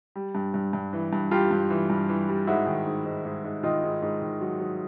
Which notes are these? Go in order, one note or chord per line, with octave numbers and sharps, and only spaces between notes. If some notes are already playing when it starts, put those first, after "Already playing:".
G3
G2
G2
G2
E3
G2
G2 F4 G4
G2
E3
G2
E3
G3
G#2 E4 F#4
D#3
G#2
G#2
G#2
G#2
D#3 D#4 F4
G#2
G#2
D#3
F#3
F#3